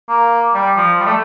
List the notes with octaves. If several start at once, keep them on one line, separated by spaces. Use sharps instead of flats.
A#3
G3
F3
G3
A3